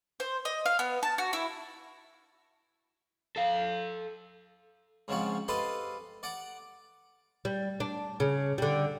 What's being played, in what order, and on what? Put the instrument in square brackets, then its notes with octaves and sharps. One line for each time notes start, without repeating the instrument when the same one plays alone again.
[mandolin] C5
D#5
F5
B3
A5
F#4
E4
[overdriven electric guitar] A4 F5
[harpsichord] G#2 C#3 F3 C4 F#4
G4 A4 B4 C5 D#5 F5
D5 F#5 D6
[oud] G3
D4
C#3
D3 G3